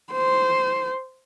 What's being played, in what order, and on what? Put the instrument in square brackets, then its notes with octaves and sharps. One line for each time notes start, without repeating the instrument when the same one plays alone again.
[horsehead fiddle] C5